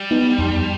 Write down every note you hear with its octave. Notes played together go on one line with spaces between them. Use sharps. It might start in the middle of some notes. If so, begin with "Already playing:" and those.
Already playing: G3
B3 D#4
F2